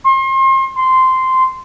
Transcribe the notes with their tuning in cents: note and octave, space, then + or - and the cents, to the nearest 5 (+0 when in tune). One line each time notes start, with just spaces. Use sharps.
C6 +35
C6 -10